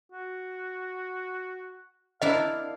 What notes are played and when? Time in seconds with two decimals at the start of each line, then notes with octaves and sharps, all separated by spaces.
0.12 F#4
2.22 D4 E4 A#4 D#5 F5